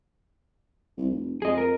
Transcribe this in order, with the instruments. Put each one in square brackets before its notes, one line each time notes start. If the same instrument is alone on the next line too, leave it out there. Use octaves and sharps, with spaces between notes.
[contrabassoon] C2
F1
[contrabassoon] F2 [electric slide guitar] G#4 D#5
[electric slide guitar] A#4